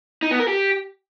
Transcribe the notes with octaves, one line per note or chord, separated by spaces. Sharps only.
D#4
B3
A#4
G4